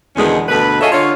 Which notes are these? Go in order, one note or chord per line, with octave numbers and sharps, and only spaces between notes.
E2 B2 D3 D#3 G#3 C#4
D2 B2 A4 B4
F4 G#4 A4 C#5 D#5 E5
D3 F4 C#5